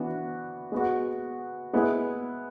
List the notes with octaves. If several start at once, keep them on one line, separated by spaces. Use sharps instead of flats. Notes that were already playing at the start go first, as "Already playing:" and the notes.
Already playing: E3 B3 D4 F#4
G#3 B3 F#4
G#3 B3 E4 G#4